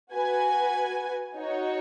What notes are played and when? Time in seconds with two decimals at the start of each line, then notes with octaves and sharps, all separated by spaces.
0.12 F#4 B4 G#5
1.35 D#4 F#4 C#5